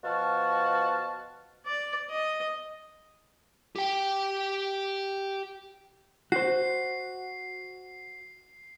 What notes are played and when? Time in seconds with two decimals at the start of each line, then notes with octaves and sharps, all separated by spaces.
0.03 B2 F3 F#4 A5 F6
1.66 D5
2.10 D#5
3.76 G4 G5
6.32 F#4 C5 C7